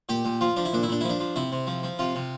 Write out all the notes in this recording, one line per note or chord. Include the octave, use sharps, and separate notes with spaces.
A#2 G4
A#2
F3 F4
F3 D4
E4
A#2 D4
E4
A#2 D4
F3 E4
D4
F3
C3 E4
C3
F3
F3
C3 F4
C3